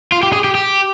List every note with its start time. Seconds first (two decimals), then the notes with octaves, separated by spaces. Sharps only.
0.12 F4
0.23 G4
0.33 G#4
0.44 G4
0.55 G4